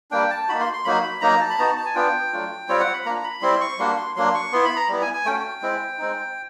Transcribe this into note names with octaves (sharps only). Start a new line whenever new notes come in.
G3 A#3 D4 G5
A5
A#3 D#4 F#4 B5
C6
C6
F#3 A#3 D#4 F#4 B5
B5
F#3 A#3 D#4 A#5
A5
B5
B3 D#4 F#4 A#5
A5
A5
G#5
B3 D4 F4 G5
F#3 A3 D4 F4
G3 C4 F4 C#5
F#5
B5
A#3 D4 F4 A#5
B5
G3 C4 E4 C6
C#6
G3 A#3 D4 F#4 C6
C6
F#3 A#3 D4 C6
C#6
B3 E4 C6
B5
A#5
G3 B3 E4
G#5
G#5
A3 C#4 F#4 G5
G#3 C4 E4
G#3 C4 D#4